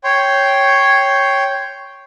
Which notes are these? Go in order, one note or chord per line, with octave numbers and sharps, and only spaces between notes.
C#5 G5 C6